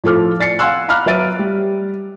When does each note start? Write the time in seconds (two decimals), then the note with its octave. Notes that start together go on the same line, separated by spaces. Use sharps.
0.04 A2 F3 F4 A4 D6 F6
0.40 D5 A6 C7 C#7
0.59 F5 F#5 G#5 C6 E6 F#6
0.89 F5 A#5 B5 D6 F6 F#6
1.06 F#3 B4 E5 A6 D7 D#7
1.39 G3